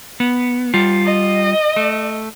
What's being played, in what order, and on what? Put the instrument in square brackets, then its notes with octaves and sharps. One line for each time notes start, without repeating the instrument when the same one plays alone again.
[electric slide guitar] B3
G3 F4
[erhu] D#5
[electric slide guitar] A3